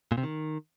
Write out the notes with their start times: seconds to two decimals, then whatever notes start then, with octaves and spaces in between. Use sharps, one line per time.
0.12 A#2
0.18 C3
0.23 D#3